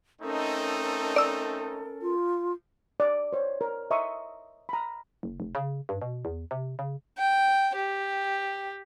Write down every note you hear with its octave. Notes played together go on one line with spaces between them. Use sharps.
A3 C4 C#4 D#4 A4 A#4
D5 E6
F4
D5
C5 C#5
A#4
D#5 E5 A#5 C6 C#6 D#6
A#5 B5
F#1
F1
C#3
G2
B2
E2
C3
C#3
G5
G4